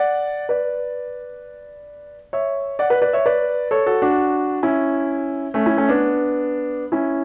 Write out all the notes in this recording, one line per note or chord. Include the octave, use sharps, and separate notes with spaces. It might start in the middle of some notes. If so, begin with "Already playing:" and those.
Already playing: D5 F#5
B4 D5
C#5 E5
D5 F#5
B4 D5
B4 D5
C#5 E5
B4 D5
A4 C#5
F#4 A4
D4 F#4
C#4 E4
A3 C#4
C#4 E4
A3 C#4
B3 D4
C#4 E4